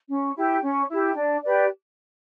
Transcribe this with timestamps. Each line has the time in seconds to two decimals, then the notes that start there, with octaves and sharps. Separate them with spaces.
0.09 C#4
0.36 E4 G4
0.62 C#4
0.89 E4 G4
1.15 D4
1.43 G4 B4 D5